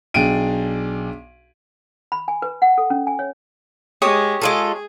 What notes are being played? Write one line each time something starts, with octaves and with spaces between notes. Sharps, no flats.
B1 D4 G#4 G5 D7 D#7
B5
G#5
B4
F#5
A4
C#4
G#5
C#5
G#3 G4 C#5 D#6
G#3 F4 G#4 A4